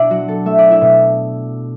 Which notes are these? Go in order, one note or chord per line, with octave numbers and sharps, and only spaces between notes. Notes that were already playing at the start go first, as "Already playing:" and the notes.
Already playing: B2 D4 E4 D5 E5
F#3 F#4
A4
A3 E5
D5
E4 E5
B2